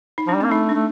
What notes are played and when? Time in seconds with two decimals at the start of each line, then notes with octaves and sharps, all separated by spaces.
0.18 D#4
0.27 F3 D4
0.35 G3
0.40 A#3 C4
0.51 A3 D#4
0.69 D4
0.74 A3